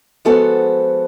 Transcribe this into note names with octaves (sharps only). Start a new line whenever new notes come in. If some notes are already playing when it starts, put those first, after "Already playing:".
F3 G#3 B3 F#4 A4 C5